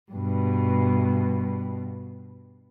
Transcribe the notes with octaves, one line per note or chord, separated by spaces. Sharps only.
G2 B2